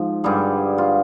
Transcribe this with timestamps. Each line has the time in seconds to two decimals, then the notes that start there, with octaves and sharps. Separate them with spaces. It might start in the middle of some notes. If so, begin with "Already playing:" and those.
Already playing: G#2 F3
0.24 G2 D3 G3 G#4
0.78 F4